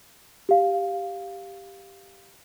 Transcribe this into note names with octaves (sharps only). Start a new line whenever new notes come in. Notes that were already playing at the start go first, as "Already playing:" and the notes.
G4 F5